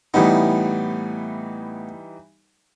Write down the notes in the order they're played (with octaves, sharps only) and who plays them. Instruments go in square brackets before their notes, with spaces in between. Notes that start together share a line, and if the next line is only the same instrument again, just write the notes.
[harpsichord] A2 B3 [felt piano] E3 G3 D#4